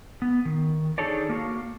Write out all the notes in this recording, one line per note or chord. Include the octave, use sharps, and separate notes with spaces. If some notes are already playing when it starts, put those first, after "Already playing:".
B3
D#3
D4 D#4 G#4 A4 C#5 D5
A#3 F#4 F5